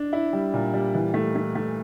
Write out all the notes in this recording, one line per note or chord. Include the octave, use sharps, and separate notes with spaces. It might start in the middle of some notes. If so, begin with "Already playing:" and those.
Already playing: D4
E4
G3
A#2
G3
E3
A3
A3
A3